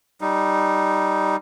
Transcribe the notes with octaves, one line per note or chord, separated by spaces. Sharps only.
G3 D#4